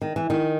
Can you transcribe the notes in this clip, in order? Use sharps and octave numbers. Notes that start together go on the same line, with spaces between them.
D#3
E3
D#3